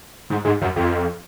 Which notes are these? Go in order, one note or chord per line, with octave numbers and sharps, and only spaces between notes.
G#2
G#2
F#2
F2